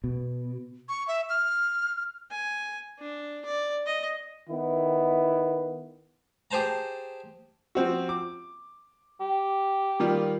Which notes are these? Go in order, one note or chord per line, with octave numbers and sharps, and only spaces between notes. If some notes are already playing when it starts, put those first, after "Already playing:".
B2
C#6
E5
F6
G#5
D4
D5
D#5
D#3 B3 E4
G4 G#4 C5 A5 A#5
F3 C4 F#4
D6
G4
D#3 G3 F4